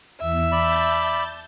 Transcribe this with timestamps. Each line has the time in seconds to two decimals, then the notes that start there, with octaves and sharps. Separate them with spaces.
0.21 E2 E5
0.52 D5 A5 B5 G6